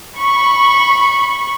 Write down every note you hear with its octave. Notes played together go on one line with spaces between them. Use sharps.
B5 C#6